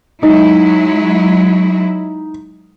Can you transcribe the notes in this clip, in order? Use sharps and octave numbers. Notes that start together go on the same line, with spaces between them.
F#3 G#3 D#4 E4